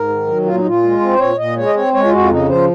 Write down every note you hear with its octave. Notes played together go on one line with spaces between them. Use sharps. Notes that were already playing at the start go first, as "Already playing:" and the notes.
Already playing: G#2 A#4
D#3
F#3
A#2 F4
D#4
A#2 F4
G#3
C4
C5
A#2 C#5
A#2 D#5
G#3 C#5
D#5
C4 C#5
G#3 C#5
F4
F2 F#4
F4
C#3 D#4
F3 C5